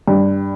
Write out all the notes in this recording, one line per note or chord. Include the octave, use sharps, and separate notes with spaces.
G2